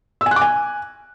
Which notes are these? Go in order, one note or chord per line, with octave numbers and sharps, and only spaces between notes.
E6
G#5
F#6
D6
G#5